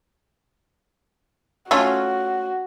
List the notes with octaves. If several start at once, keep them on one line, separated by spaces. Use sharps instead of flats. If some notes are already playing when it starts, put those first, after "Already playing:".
A3 C#4 F4 F#4